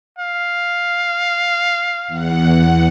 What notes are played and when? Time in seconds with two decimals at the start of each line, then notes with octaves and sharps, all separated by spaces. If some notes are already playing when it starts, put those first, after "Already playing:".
0.19 F5
2.08 E2 F#5